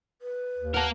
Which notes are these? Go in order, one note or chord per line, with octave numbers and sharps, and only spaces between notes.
B4
D#2
A#3 A#4 F#5 A5